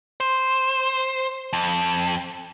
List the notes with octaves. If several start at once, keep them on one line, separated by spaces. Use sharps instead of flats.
C5
F2